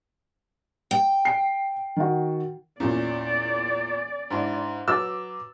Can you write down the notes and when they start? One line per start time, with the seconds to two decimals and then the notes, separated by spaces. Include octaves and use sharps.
0.91 G5
1.25 C7
1.96 D#3 F#4
2.80 E2 A#2 C#4 D5
4.30 G#2 D4 E4
4.88 F#3 B4 D6 E6 A6